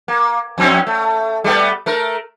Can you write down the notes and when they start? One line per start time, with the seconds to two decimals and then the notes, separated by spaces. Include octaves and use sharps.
0.08 A#3
0.58 F2 C4 C#4
0.87 A3
1.44 G3 A3 B3
1.86 A3 A#4